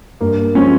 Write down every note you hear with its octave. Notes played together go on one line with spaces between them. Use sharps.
G2 A#3
F3 G#3 C4 C#4